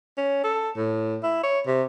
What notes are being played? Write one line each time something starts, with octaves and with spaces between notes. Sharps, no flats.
C#4
A4
A2
E4
C#5
C3